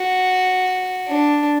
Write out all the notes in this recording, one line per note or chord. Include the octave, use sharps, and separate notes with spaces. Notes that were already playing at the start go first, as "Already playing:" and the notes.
Already playing: F#4
D4